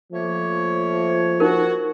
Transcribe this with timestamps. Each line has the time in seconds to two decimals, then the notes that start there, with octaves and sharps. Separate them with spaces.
0.13 F3 A3 A#3 C#5
1.40 D#4 F#4 A#4